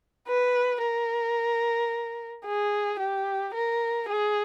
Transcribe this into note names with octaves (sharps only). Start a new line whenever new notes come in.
B4
A#4
G#4
G4
A#4
G#4